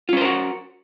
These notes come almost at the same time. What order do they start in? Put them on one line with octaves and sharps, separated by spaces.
F4 C#4 C5 A#4 F#4